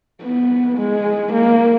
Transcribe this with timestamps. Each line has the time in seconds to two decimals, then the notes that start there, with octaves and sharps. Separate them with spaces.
0.22 B3
0.78 G#3
1.33 A#3